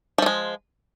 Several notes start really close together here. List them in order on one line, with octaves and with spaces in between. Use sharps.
F3 A3 G#3